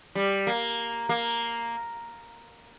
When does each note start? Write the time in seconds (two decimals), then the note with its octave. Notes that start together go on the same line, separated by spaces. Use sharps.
0.15 G3
0.47 A#3
1.09 A#3